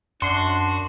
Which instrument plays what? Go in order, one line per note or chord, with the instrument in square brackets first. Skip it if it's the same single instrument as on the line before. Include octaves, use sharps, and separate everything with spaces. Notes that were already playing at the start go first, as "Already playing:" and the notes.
[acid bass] F#2 [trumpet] D4 [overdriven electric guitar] F#4 [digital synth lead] C6